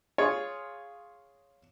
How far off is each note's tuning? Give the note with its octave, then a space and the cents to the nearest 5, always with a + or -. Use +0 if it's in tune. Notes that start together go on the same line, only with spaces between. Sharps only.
F4 +0 G#4 +0 C#5 +0